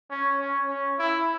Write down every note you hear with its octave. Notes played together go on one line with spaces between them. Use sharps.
C#4
C#4
C#4
E4